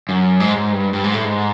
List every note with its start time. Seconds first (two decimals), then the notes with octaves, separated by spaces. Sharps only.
0.09 F#2
0.40 G#2
0.56 G#2
0.72 G2
0.93 G2
1.04 G#2
1.14 A2
1.24 G#2